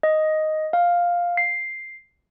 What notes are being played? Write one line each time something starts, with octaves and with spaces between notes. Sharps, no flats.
D#5
F5
C7